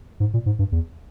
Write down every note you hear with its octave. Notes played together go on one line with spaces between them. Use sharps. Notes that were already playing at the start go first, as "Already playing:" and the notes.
G#2
A#2
G#2
G2
E2